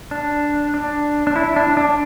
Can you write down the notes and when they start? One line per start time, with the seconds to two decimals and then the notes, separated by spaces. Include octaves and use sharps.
0.11 D4
0.74 D4
1.27 D4
1.36 E4
1.56 D4
1.77 D4